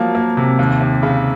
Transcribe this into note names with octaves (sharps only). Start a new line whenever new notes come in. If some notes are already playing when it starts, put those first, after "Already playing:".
Already playing: F3 F#3 A#3
A#3
C3
D#2
D#2
C#3